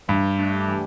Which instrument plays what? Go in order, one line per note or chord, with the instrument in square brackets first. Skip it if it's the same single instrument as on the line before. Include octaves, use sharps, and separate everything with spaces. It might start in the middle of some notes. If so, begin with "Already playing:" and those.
[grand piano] G2 [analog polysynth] E3
[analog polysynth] A3 D4 G4
E3